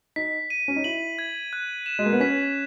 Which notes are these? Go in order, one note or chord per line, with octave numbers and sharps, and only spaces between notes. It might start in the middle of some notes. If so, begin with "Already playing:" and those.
D#4 B6
D#7
C#4
D#4
E4 F#7
G#6
F#6
E7
G#3
A#3
B3
C#4 B6